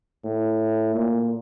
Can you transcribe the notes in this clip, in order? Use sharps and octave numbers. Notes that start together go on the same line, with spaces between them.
A2
A#2